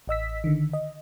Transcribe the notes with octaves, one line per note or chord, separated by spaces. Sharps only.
A1 D#5 E6 B6
D3 D#3
D#5